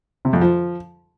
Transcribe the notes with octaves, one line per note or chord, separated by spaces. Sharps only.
C3
F2
F3